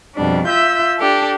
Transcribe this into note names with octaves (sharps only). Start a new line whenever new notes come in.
F2 B2 G3 D4
F4 E5 E6 G6
D4 G4 A4